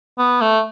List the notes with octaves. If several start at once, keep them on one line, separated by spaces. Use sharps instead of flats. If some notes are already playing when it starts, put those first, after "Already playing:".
B3
A3